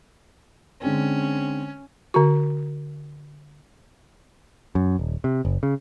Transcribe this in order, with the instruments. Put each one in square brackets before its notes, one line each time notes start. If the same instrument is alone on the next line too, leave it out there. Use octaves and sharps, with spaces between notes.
[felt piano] D3 G#3 C4 [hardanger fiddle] C#4
[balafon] D3 F#4
[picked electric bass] F#2
D#1
C3
F#1
C#3